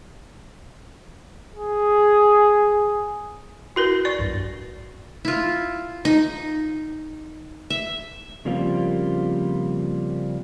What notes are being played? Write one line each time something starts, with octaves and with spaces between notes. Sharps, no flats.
G#4
E4 F#4 A#4 B4 A#6 C7
D5 C#6
B1 G2
E4 F4
D#4
E5
C#3 F3 G3 A#3 C4 F4